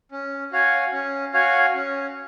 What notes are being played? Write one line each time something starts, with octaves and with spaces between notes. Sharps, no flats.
C#4
F#4 C#5 F5 G#5
C#4
F#4 C#5 F5 G#5
C#4